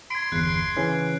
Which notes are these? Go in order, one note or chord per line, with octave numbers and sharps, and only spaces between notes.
C6 G#6 D7
G1 E2 F#6 C7
C#3 E3 C#4